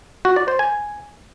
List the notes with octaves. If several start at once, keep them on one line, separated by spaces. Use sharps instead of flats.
F#4
D5
C5
G#5